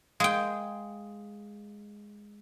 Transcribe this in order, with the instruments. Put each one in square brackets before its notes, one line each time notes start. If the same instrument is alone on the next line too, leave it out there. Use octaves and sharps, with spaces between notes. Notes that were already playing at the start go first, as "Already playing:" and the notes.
[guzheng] G#3 G5 [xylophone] F5 D#6